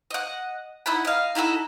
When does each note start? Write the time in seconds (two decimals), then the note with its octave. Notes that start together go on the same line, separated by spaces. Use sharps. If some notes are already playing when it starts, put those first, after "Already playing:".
0.10 D#5 F#5
0.86 D#4 E4 F#5 B5
1.05 D#5 F5
1.35 D#4 E4 F#4 A4